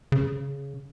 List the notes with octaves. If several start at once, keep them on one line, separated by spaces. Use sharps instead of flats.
C#3